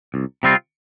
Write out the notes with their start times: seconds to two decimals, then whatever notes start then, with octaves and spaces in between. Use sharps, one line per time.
0.14 C2
0.43 C3 G3 C4 F4